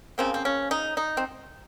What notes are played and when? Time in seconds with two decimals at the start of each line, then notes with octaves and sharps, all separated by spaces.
0.18 C#3 F3 A#3 C4
0.34 C4
0.45 C#4
0.71 D#4
0.97 D#4
1.17 C4